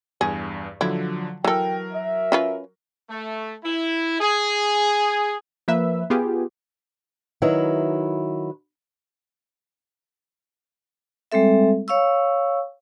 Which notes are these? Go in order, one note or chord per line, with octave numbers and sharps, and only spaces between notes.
E2 G2 G#4
D3 F3 F#3 E4
E3 F#3 A4 A#4 G5
E5
C#4 F4 B4
A3
E4
G#4
F3 A#3 B4 E5
B3 F4 G4 G#4
D#3 F#3 E4 B4
G3 G#3 C4 A4 E5
C#5 F5 C#6 E6